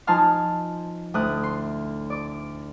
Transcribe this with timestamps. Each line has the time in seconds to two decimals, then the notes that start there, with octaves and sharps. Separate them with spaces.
0.07 F3 D#4 G#5 A5 C6 F6
1.14 D2 A2 D#6 F#6
1.43 C6
2.10 D5 D6